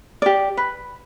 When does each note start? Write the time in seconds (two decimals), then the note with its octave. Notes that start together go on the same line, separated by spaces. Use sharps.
0.22 G4 D5
0.57 B4